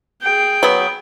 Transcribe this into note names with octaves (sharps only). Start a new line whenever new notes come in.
G#4 G5
F#3 B3